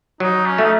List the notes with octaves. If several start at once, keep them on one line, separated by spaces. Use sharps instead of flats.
F#3 D#4
C#4
A3 D#4